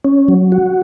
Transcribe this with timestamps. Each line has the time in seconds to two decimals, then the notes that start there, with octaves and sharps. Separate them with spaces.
0.04 C#4
0.28 F#3
0.52 F#4